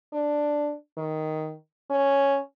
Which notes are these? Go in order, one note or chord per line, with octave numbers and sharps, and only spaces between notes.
D4
D#3
C#4